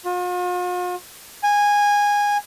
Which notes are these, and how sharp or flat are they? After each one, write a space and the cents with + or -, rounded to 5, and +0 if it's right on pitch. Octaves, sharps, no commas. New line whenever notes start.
F4 +45
G#5 -15